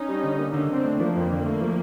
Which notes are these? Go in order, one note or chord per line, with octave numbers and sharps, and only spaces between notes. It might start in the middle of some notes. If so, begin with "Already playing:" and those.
Already playing: C#4 D#4
G3
D3
A#3
D3
D3 C4 D4
A3
F3 A#3
F2
D3
A3
F3